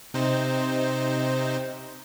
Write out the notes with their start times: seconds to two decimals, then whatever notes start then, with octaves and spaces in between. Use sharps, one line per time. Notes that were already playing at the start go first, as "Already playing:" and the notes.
0.14 C3 D#4 C5